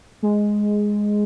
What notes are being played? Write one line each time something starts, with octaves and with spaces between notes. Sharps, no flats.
G#3